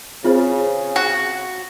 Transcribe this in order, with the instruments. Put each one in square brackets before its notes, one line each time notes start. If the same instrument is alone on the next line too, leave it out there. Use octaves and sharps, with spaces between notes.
[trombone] C#3 [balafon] C4 G#4 C5 [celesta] F4
[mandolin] F#4